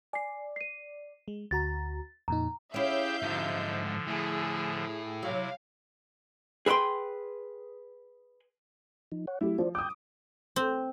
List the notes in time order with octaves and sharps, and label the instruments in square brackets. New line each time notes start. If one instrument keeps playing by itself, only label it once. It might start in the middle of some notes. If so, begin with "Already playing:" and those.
[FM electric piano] D5 [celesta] G#5 C7
[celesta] C7 D#7
[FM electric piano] G#3
[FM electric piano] D2 F#4 A#5 [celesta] A6
[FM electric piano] F2 A#2 D#4 [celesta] A#5
[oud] C#4 E4 [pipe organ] G4 G#4 G5 [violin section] E5 F5 G6
[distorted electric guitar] G#2 F#3 [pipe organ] D3 F3
[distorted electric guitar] A2 [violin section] G#4
[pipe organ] C3 E4 [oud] F#3 [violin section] F5
[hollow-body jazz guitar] G#4 B4 E5 G5 C6
[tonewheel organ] F3 D#4
C#5 F#5
[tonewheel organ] F#3 A3 [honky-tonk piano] E4 G4
[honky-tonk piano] F3 [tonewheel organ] C5 D5
[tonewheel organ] G5 G6 [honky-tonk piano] D6 D#6
[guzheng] C4